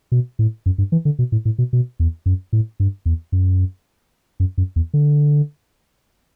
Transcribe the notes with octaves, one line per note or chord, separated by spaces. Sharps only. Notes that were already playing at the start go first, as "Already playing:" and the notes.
B2
A2
F#2
G2
E3
D3
B2
A2
A2
B2
B2
E2
F#2
A2
G2
E2
F#2
F#2
F#2
E2
D3